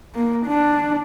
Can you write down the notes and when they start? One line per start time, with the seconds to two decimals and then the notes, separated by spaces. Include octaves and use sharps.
0.15 A#3
0.46 D4